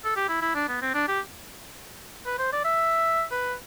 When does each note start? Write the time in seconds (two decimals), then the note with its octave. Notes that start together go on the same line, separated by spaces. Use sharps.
0.05 A4
0.16 G4
0.28 E4
0.42 E4
0.55 D4
0.69 B3
0.82 C4
0.94 D4
1.08 G4
2.26 B4
2.39 C5
2.53 D5
2.65 E5
3.31 B4